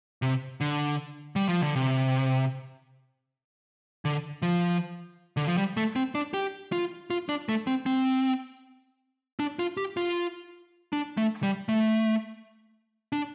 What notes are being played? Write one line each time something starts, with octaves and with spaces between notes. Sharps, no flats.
C3
D3
G3
F3
D3
C3
D3
F3
D3
F3
G3
A3
C4
D4
G4
F4
F4
D4
A3
C4
C4
D4
F4
G4
F4
D4
A3
G3
A3
D4